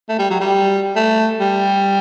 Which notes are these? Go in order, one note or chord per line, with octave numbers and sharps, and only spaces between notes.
A3
G3
F#3
G3
A3
G3